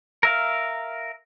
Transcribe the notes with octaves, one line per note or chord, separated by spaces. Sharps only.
A#4 E5 F5